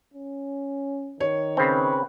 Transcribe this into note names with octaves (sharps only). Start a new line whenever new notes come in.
C#4
D#3 C#5
C#3 C4 B4